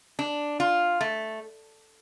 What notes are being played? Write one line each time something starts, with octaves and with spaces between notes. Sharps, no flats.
D4
F4
A3